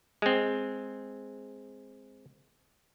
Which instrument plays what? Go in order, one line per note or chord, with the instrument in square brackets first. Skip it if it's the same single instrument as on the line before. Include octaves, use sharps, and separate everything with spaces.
[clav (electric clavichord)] G#3 C4